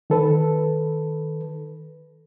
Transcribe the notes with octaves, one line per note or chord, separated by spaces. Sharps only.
D#3 A4 B4